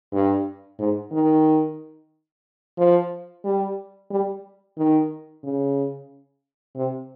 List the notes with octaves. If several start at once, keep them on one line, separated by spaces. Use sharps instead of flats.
G2
G#2
D#3
F3
G3
G3
D#3
C#3
C3